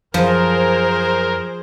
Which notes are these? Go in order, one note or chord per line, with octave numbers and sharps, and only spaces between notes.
F#2 F3 G#4 A#4 C5